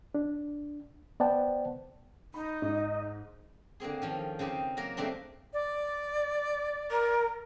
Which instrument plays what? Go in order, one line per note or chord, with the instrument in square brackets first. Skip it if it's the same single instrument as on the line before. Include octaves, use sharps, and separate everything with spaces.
[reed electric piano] D4
B3 C5 D5 F#5 G5 A5
[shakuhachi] D#4 [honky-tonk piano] B5
[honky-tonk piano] G#2 [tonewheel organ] D#5
[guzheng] D3 A#3 C4 G#4
D#3 F3 C#4
C#3 C4 D#4 G4
F#3 A#3 A#4
C#3 A3 A#3 C4 D4
[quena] D5
[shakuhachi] A#4